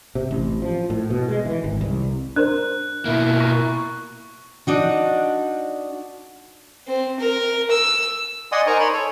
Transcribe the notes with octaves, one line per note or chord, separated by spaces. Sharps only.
C3
A1
F3
A2
B2
G#3
E3
G#1
C2
D4 A#4 C5 F#6
B2 A#3 E4
A#5 C#6
D4 D#4 F#4
C4
A#4
E6
D5 D#5 F#5 G#5 C6 D#6
D#4 A#4 C5 G#5 A#5 C#6
C#5 B5 C6
A4 C#5